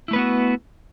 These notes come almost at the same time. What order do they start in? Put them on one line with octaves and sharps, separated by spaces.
E4 A3 B4 B3 F#4